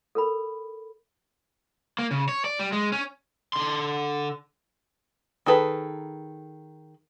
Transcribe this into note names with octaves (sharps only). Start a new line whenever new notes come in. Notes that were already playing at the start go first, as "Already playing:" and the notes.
A4 A#4 B5
A#3
C#3
C#5
D5
G3
G#3
C#4
D3 C6
D#3 G#4 A4 B4